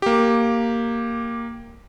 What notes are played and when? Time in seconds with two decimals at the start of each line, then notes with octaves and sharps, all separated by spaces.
0.02 A#3 G4